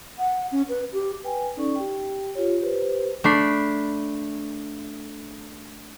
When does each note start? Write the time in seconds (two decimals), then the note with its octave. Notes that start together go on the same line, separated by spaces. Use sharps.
0.19 F#5
0.52 C#4
0.69 B4
0.92 G4
1.24 B4 G5 G#5
1.57 C#4 D#4 A4 D5 C#6
1.76 G4 G5
2.35 F4 G4 C#5
2.61 G4 B4 C5
3.24 A3 D4 B5 C7